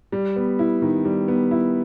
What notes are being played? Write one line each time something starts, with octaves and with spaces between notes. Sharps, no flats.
G3
B3
E4
D#3
G3
B3
E4